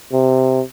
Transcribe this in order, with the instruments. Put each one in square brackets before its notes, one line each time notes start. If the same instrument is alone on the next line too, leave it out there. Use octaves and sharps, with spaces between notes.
[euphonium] C3